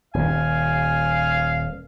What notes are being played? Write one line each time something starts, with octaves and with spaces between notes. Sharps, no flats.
D#1 F5 G#5